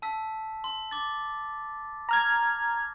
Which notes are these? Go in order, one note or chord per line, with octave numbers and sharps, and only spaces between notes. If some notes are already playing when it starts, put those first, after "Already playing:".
A5 E6 B6
C6
D6 A6
A#5 F6 G#6